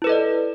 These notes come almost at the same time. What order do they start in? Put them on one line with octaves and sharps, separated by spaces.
E4 B4 A4 D#5 D5